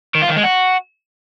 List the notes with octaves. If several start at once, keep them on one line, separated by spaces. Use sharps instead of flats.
D#3
F4
D#3
G#3
F#4